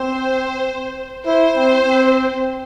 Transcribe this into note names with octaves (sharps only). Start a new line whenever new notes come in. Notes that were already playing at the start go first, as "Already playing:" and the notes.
Already playing: C4 C5
E4 C5
C4
C4